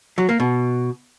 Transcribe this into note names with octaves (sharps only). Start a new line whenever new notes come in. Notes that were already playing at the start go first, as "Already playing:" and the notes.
F#3
A#3
B2